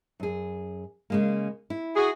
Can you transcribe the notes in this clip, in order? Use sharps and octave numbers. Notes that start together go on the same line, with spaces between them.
F#2 G#4
C#3 G#3 A#3
E4
F#4 G#4